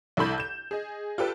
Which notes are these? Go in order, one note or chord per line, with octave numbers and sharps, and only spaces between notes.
C2 E4 A4 B5 G6
G6 E7
G#4 D#5
F4 G4 A4 B4